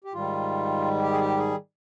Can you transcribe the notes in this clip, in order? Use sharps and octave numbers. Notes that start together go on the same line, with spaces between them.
G4
G#2 D#3 G3 F4
G4
G#4
G4
G#4